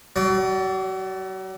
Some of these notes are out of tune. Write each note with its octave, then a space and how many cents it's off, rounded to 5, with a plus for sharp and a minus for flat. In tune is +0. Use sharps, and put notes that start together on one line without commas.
F#3 +35 D5 +0